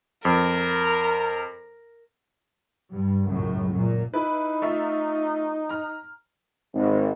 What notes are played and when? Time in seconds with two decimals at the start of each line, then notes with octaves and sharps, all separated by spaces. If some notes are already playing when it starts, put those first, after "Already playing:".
0.25 F2 A#4
2.92 G2
3.26 C#2 F#2 A2
3.70 F#2 A#2
4.14 D#4 E4 B4
4.62 A3 F4 E5
5.69 A#5 F6
6.74 G#1